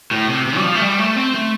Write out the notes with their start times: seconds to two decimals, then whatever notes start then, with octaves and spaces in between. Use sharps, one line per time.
0.11 A2
0.29 C3
0.47 C3
0.57 G3
0.64 F3
0.75 A3
0.82 G3
0.99 A3
1.16 C4
1.34 A3